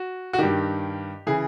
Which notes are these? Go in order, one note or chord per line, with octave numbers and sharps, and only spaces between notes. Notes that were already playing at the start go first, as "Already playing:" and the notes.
Already playing: F#4
F#4
G2 D#3 G4
C#3 E3 G#4